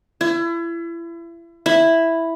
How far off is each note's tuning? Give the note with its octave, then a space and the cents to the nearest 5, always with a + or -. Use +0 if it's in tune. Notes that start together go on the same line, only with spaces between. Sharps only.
E4 +35
E4 +0